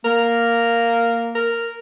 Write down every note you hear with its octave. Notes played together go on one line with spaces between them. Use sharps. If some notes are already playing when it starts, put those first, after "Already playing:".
A#3 A#4
A#4